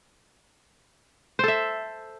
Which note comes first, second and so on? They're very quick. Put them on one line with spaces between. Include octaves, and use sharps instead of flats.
C5 A4 E5